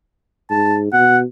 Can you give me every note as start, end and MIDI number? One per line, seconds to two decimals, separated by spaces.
0.51 0.89 44
0.51 0.77 81
0.93 1.24 47
0.93 1.18 78